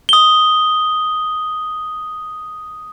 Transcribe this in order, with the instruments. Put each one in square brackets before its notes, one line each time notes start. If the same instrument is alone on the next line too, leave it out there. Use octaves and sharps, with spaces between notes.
[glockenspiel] D#6 G7